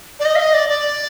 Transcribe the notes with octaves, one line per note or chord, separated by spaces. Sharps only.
D5
D#5
F5
D#5
D5
D5